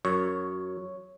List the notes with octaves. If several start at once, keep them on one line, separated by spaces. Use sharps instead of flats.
F#2 C#5